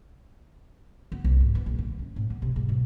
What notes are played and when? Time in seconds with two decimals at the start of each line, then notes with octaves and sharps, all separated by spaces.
1.12 B3
1.24 C2
1.40 G#2
1.55 B3
1.66 A#1
1.79 D3
1.99 C#4
2.16 A2
2.30 B3
2.42 C3
2.56 G#2
2.69 B1